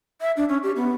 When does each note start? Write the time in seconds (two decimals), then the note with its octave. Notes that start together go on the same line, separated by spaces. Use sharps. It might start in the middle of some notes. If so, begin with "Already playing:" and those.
0.21 E5
0.37 D4
0.49 C#4
0.63 G4
0.76 B3